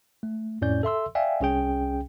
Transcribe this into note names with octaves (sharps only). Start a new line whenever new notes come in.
A3
F2 A2 C#4 D5 G6
A4 E5 C6 E6
D5 E5 F5 G5 G#5
C2 C#4 G#4 G5